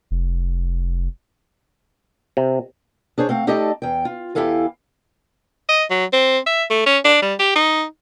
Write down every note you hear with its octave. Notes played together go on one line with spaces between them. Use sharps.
F1
C3
D4 G#4 C5 C#5
A3 C4 F5 F#5
A3 D#4 G4 A4 D5 D#5
E2 G5
F4
E2 E4 G4 A4 F5 G#5
D#5
F#3
C4
E5
A3
C#4
D4
G3
G4
D#4